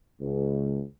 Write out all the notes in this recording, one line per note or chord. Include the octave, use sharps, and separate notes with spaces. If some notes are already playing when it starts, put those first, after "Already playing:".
C#2